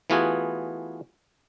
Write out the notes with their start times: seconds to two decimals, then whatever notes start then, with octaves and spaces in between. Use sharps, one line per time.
0.10 E3 A3 B3 F4 F#4 G#4